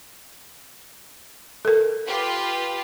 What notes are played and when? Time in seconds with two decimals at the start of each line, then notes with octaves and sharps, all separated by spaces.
1.65 A4 A#4
2.06 F4 G4 B4